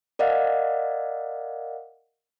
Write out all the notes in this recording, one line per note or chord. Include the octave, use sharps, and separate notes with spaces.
A#4 D5 D#5 F5 F#5